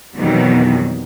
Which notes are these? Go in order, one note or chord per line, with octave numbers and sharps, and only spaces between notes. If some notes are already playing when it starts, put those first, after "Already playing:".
F2 B2 D#3 E3 F#3 G3